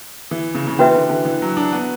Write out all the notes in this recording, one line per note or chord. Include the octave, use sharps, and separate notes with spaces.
E3
C#3
C#3
E3 C#4 F#4 B4 E5
D3
D3
E3
F#3
D4
B3